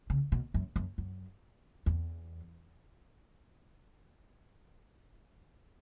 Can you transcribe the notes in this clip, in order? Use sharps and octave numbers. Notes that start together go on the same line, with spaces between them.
C#3
B2
F#2
F#2
F#2
E2